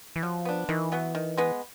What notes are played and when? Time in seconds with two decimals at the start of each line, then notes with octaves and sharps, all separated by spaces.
0.16 E3
0.23 F3 F#3
0.45 B3 D4
0.69 D#3 E3
0.92 F#3 B3
1.15 D#3
1.38 G#3 B3